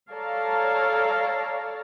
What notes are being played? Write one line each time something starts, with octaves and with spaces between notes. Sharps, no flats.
A4 C#5 D5 F5 A5 A#5